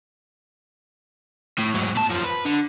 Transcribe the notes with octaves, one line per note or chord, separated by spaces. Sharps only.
A2
G#2 F#3
A#2 A5
F#2 F3
B4
D3